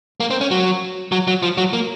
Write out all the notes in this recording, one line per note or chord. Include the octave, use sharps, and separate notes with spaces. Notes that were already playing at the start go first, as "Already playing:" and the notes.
A#3
C4
C#4
F#3
F#3
F#3
F3
F#3
A#3